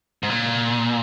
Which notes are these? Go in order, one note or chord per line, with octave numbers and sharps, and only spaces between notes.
G#2
A#2